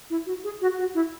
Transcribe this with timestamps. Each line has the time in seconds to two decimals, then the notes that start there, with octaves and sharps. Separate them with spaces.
0.10 E4
0.26 F#4
0.44 G#4
0.61 F#4
0.78 F#4
0.95 E4